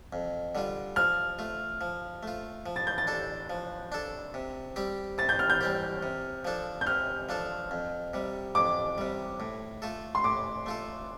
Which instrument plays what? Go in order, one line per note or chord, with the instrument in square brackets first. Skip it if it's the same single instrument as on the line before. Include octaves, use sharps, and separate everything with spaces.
[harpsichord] F2
D3 G3 F4
[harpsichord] F3 [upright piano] F6
[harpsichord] A3 F4
F3
A3 F4
F3
[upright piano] A6
G6
A6
[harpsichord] D4 A4
F3
D4 A4
C3
G3 C4 G4
[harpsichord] C3 [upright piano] A6
[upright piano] G6
F6
G6
[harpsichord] G3 C4 G4
C3
F3 D4 A4
[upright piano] G6
[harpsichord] C3 [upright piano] F6
[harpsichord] F3 D4 A4
F2
C3 G3
[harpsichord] F2 [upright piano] D6
[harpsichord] C3 G3
A2
A3 F4 A4
[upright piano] C6
[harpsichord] A2 [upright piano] D6
[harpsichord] A3 F4 A4